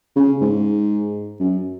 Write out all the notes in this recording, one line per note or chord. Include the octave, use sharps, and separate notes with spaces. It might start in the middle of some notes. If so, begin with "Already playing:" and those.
C#3
G#2
F#2